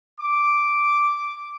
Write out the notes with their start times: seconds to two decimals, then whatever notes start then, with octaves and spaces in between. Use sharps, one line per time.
0.20 D6